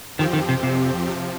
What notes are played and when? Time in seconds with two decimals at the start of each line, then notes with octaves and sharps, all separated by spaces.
0.18 F2 D#3 F3 C4 G4
0.33 D#3
0.49 C3
0.63 C3
1.08 C3 F3